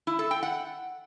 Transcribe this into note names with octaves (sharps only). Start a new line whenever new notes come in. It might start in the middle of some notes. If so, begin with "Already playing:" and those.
E4
A4
G5
F#5